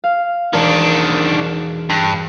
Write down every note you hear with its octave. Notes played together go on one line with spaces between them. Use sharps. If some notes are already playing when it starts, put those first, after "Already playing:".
F5
E1 D#3 D4 A#4
G2 C7